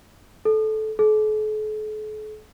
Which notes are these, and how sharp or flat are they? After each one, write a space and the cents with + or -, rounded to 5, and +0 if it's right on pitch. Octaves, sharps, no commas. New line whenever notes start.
A4 -20
A4 -45